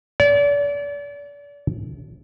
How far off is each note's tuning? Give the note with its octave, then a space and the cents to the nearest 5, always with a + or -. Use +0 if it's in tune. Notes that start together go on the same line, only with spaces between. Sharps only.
D5 -35